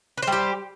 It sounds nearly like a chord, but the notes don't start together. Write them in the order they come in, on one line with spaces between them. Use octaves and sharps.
B4 C5 G3 G4